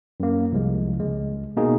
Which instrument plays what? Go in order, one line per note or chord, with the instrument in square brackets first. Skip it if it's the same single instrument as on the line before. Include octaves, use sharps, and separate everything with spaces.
[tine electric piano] F#2 A#3
C2 F3 G#3
C#2 G#3
B2 A#3 D#4 G#4